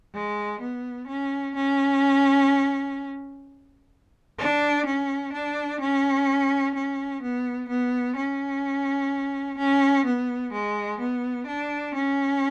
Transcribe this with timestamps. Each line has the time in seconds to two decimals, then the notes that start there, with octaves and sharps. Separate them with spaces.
0.13 G#3
0.61 B3
1.08 C#4
1.55 C#4
4.38 D4
4.86 C#4
5.33 D4
5.81 C#4
6.75 C#4
7.22 B3
7.69 B3
8.16 C#4
9.58 C#4
10.06 B3
10.53 G#3
11.00 B3
11.47 D4
11.95 C#4